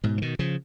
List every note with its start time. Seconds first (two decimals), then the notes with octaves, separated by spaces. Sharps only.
0.04 G#2 B2
0.18 F3
0.22 B2 D#3
0.39 C#3 F3